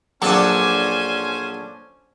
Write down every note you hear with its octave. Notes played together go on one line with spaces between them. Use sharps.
A#1 F#3 C#4 D4 A4 C5 G#5 C#6